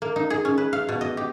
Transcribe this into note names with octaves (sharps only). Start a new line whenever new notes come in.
A#3
D#4
G#4
C#4
B4
F5
B2
D#5
G4